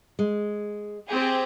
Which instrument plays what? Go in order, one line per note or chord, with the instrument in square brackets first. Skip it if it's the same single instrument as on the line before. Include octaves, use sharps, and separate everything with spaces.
[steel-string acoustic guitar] G#3
[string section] C4 G4 G#4